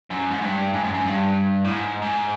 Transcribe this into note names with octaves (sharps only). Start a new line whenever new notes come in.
F#2
G#2
G2
G#2
F#2
F#2
G2
A2
G#2
G#2